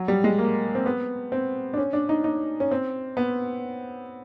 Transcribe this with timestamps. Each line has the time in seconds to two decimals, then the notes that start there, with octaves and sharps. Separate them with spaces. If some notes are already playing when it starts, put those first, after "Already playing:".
Already playing: F#3
0.08 G3
0.24 G#3
0.39 A#3
0.75 C4
0.86 B3
1.32 C4
1.73 D4
1.78 C#4
1.93 D4
2.09 D#4
2.24 D#4
2.60 C#4
2.71 C4
3.17 B3